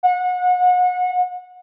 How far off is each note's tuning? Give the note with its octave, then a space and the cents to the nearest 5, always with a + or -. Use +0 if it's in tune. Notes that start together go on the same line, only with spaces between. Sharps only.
F#5 -35